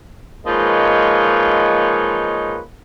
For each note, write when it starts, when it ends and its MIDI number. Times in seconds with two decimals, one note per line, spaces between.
0.46 2.59 53
0.46 2.59 56
0.46 2.59 58
0.46 2.59 63
0.46 2.59 71
0.46 2.59 73